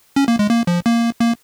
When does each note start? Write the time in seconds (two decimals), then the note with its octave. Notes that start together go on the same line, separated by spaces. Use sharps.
0.16 C#4
0.28 A#3
0.39 G#3
0.50 A#3
0.67 F3
0.86 A#3
1.20 A#3